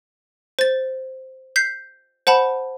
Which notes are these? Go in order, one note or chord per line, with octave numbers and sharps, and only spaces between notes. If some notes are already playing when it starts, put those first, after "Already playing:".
C5 A6
G6 B6 C7
C5 F#5 A5 B5